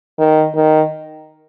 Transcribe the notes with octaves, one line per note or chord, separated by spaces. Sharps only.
D#3
D#3